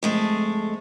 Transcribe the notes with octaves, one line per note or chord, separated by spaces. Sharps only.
F2 G#3 A3